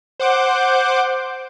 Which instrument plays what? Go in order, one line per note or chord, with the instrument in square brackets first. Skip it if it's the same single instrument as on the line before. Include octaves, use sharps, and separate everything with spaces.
[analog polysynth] C5 F#5 D6 G6